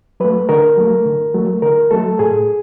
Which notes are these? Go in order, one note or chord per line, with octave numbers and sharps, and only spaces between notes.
F#3 A3 B4
D3 A#4
F#3 A3
D3
F#3 A3
D3 A#4
F#3 A3 A4
A2 G#4